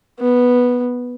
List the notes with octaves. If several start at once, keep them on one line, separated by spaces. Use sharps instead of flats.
B3